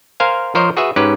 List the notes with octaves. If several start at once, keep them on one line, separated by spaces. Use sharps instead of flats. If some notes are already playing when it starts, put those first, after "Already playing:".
A#4 C5 F5 G#5
F3 A#4 C5 C#5 D#5
F#4 G#4 B4 E5
G#2 C#4 G4 B4